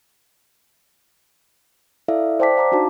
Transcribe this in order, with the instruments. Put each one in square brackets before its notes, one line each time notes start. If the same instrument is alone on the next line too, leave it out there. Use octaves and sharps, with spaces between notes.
[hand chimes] E4 A4 D5 E5 F5
C5 D5 G5 A5 D6 B6
F5 A#5 D6
D4 D#4 F#4 A5